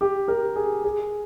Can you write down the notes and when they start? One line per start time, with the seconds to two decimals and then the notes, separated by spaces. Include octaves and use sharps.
0.01 G4
0.28 G4 A#4
0.56 G#4
0.84 G#4